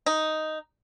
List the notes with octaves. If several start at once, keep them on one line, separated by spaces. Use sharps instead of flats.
D#4